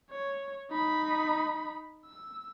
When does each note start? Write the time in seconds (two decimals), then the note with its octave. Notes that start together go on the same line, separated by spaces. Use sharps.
0.11 C#5
0.71 D#4 B5
2.06 E6